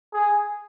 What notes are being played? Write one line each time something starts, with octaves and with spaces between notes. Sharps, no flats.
G#4